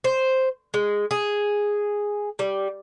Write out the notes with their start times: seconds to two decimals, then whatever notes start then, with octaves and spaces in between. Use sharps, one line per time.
0.04 C5
0.74 G#3
1.11 G#4
2.39 G3